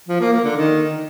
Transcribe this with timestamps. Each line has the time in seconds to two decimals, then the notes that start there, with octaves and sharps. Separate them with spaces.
0.08 F3
0.20 A#3
0.32 A#3
0.44 D3
0.56 D#3